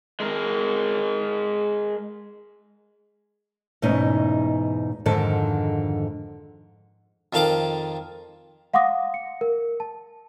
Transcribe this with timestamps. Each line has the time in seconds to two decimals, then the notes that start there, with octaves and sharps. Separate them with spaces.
0.20 G#3 A#4
3.82 E2 G#2 B2 A3 C#4 D#4
5.06 F2 G#2 D3 D#3 A4 A5
7.33 F2 D#3 A4 F5 A5 D6
8.74 F5 F#5 C6 D6 D#6 A#6
9.14 C#7
9.41 A#4
9.80 A5